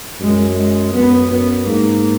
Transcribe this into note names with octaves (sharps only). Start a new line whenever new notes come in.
F#2 G#3
G#3
F#2 B3
F#2 B3
G#2 A#3